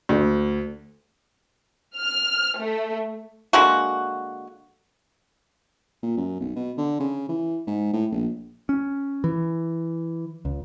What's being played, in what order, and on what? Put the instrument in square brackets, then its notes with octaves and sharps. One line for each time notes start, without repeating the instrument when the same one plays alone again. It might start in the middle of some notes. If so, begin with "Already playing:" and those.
[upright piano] D2
[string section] F6
A3
[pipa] D3 G#3 A#3 F#4
[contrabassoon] A#2
F#2
B1
B2
D3
C#3
E3
G#2
A2
A#1
[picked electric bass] C#4
E3
C#2